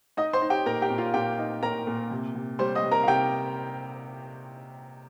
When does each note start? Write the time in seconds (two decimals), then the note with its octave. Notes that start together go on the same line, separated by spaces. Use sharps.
0.17 D#4 D#5 D#6
0.33 C5 C6
0.42 D#4
0.50 G4 G5
0.66 A#2 A#4 A#5
0.82 G4 G5
0.90 A#2
0.98 F4 F5
1.14 A#2 G4 G5
1.39 D#4
1.63 A#2 A#4 A#5
1.87 A#2
2.11 C3
2.35 C3
2.59 G3 C5 C6
2.75 D#5 D#6
2.83 C3
2.91 A#4 A#5
3.03 F5
3.07 C3 G4 G5